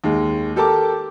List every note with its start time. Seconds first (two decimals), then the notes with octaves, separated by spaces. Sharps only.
0.04 D#2 G#3
0.56 G4 A4 A#4 A5 D6